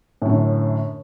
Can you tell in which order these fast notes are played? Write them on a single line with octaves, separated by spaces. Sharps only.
A2 F#2 D3